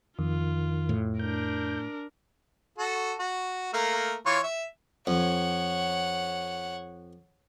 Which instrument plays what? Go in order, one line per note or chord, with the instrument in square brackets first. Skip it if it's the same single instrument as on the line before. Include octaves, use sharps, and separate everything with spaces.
[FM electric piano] F2 [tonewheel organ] D#3 [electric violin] F4
[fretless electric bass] A2
[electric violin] D4 A#4 [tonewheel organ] G6
[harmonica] F#4 A4
F#4
A3 A#3 A#4
E3 F4 C#5
E5
[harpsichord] F2 [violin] C#5 F#5